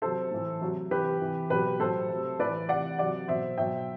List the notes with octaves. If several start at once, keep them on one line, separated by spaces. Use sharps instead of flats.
C3 F#3 A4 C5
A2 E3
C3 F#3
C3 E3 G4 B4
C3 E3
B2 F#3 G4 B4
A2 F#3 A4 C5
C3 F#3
A2 E3 B4 D5
C3 E3 D5 F#5
C3 F#3 D5 F#5
B2 F#3 C5 E5
B2 F#3 E5 G5